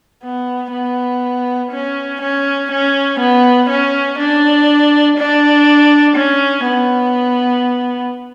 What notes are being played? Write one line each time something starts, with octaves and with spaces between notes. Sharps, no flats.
B3
B3
C#4
C#4
C#4
B3
C#4
D4
D4
C#4
B3